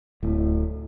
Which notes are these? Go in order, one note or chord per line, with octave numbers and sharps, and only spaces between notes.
D1 A2